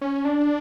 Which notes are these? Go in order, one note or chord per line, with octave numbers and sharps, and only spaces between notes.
C#4
D4